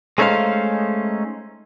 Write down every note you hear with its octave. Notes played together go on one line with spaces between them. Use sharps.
G#3 A3 C#4 D#4 C5 F5